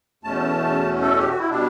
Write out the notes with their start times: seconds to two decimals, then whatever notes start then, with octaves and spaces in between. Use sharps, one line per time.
0.23 E2 B2 A3 C#4 A5
1.02 A4
1.18 G4
1.28 F#4
1.38 E4
1.49 B2 G3 D4